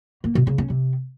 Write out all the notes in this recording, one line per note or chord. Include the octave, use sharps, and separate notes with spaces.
A#3
B2
C#3
C#4
C3